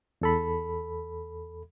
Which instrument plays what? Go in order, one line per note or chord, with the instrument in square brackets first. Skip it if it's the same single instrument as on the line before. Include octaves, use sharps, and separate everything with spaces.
[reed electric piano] E2 A4 B5